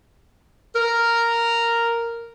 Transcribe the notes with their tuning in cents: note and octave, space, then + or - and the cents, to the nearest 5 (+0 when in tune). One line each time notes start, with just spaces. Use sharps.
A#4 -5